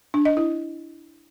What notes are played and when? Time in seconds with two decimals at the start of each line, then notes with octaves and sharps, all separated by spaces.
0.14 D4
0.25 D#5
0.37 E4